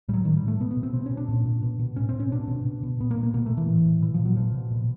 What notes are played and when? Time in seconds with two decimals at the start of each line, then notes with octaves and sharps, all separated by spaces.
0.08 A2 G3
0.14 F#3
0.25 A2 D#3
0.37 G3
0.42 A2
0.48 A3
0.60 B2 B3
0.71 B3
0.77 B2
0.83 C4
0.94 B2 C4
1.06 C#4
1.11 B2
1.17 D4
1.29 A#2
1.46 A#2
1.62 B2
1.79 B2
1.96 A2 C#4
2.09 C4
2.14 A2
2.20 C#4
2.32 B2 D4
2.48 B2
2.65 B2
2.83 B2
3.00 A#2 B3
3.11 A#3
3.17 A#2
3.23 A#3
3.34 B2 A#3
3.46 A3
3.51 B2
3.57 E3
3.68 A2
3.85 A2
4.02 A#2 E3
4.14 F3
4.19 A#2
4.25 F#3
4.36 B2 F3
4.54 B2
4.71 A#2